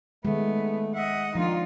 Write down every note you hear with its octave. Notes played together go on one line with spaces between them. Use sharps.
D#3 G#3 A3 B3
D#5 E5 F#5
D#3 F3 A#3 D4 D#4 F4